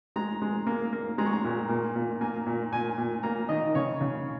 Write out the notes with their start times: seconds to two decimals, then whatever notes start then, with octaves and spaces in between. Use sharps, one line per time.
0.16 G#3 A#5
0.42 G#3
0.67 A#3
0.93 A#3
1.18 G#3 A#5
1.26 C#6
1.33 A#5
1.44 A#2
1.69 A#2
1.96 A#2
2.21 A#3 G#5
2.47 A#2
2.72 A#2 G#5
2.98 A#2
3.23 A#3 A#5
3.49 D#3 D#5
3.75 C#3 C#5
4.01 C#3